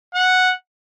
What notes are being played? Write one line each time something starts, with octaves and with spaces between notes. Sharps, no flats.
F#5